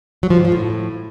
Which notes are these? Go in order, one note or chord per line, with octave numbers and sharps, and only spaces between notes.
F#3
F3
G#2
F3
A2